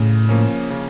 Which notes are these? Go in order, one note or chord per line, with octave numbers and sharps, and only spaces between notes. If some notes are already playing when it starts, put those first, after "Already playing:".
Already playing: A2 C#3
F3 A#3 C#4
C#3